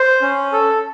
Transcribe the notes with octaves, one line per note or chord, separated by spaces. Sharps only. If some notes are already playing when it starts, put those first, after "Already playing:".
Already playing: C5
C#4
A4